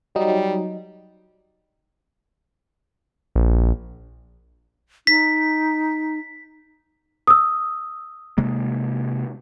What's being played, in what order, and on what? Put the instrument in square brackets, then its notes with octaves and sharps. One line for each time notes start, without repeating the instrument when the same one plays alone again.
[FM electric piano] F#3 D#4 [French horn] G3
[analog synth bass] A#1
[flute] D#4 [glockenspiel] B6
[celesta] D#6 E6
[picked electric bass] C3 G#3 A#3